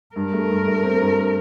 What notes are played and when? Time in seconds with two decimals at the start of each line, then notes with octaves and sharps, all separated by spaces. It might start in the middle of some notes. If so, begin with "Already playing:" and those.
0.16 G2 A#4
0.33 A3
0.50 G2
0.67 A3
0.84 C4
1.01 G2